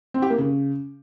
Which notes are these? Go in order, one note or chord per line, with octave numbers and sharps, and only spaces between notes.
C4
G4
A#3
C#3